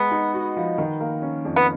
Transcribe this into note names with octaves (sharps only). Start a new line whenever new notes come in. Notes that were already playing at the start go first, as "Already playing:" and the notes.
Already playing: G#3 B3
D#4
F#4
F3
D#3
A#3
C#4
F2
B3